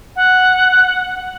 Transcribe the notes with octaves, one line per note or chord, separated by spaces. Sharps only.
F#5